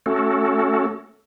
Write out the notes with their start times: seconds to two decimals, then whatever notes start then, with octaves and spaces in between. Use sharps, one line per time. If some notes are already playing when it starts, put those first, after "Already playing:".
0.06 A3 C#4 F#4 A4